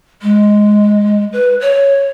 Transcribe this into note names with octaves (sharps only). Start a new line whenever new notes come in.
G#3
B4
C#5